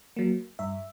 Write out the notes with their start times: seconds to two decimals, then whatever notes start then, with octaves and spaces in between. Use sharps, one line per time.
0.17 F#3 A#3
0.59 G2 E5